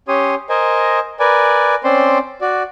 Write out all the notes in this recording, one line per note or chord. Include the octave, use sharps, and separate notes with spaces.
C#4 G4 C#5 C6 D#6
A#4 C5 D#5 G#5
A#4 B4 D5 G#5
C4 C#4 C5 D5 C6
F#4 D5